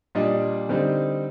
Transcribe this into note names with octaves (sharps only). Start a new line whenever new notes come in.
A#2 G3 D4 D#5
D3 G3 C4 D#4